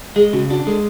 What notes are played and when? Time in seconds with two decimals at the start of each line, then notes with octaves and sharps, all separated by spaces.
0.16 G#3 G#4
0.33 C#3 F#4
0.50 D4 F#4
0.67 G#3 A4